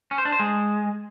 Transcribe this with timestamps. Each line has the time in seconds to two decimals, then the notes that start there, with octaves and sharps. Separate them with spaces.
0.11 C#4
0.18 C5
0.25 D4
0.32 C5
0.39 G#3